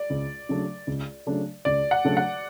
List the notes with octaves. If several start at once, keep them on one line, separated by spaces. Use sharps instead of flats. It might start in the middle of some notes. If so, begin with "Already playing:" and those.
Already playing: D5
C#2
C#3 F#3 A3 D4
C#2
C#3 F#3 A3 D4
C#2 D5
F#5
C#3 F#3 A3 D4
F#5